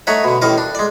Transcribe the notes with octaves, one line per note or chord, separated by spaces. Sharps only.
A3 D#4 C#5 E5 F#5
B2 D3
A1 A2 D#3 A#4 D6
D4
G#3 D5